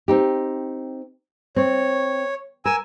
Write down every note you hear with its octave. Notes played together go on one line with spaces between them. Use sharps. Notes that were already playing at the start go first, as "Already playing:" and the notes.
C4 D#4 G4
C4 C#5
A#4 G#5 E6